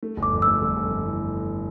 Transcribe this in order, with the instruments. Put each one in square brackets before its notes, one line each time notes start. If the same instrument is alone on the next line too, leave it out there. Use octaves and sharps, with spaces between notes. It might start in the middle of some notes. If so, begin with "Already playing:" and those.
[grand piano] A3
G1
[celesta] D6
[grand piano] F2
[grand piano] A3 [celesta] E6
[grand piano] G1
G1
A3
E3